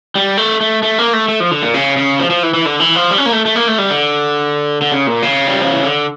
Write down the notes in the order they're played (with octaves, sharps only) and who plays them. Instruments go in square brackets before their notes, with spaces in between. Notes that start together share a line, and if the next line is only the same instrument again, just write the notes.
[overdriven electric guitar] G3
A3
A3
A3
A#3
A3
A3
F3
D3
A#2
C#3
C#3
F3
F3
E3
E3
D3
E3
F3
G3
C#4
A#3
A3
A3
A#3
A3
G3
D3
D3
C#3
A#2
C#3
G3
F3
E3
D3